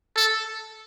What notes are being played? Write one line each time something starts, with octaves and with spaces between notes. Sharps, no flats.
A4